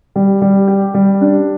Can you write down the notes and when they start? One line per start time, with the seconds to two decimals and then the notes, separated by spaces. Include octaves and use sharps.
0.16 G3
0.42 G3
0.68 G4
0.94 G3
1.21 D4